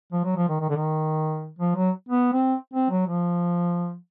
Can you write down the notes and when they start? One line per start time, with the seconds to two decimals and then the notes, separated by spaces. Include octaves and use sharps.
0.12 F3
0.25 F#3
0.36 F3
0.49 D#3
0.61 D#3
0.69 D3
0.76 D#3
1.59 F3
1.76 F#3
2.09 B3
2.33 C4
2.74 C4
2.91 F#3
3.07 F3